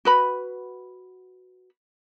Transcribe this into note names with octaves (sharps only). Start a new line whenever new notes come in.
F#4 B4 B5